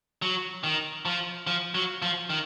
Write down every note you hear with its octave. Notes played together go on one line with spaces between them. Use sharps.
F#3
D#3
F3
F3
F#3
F3
D#3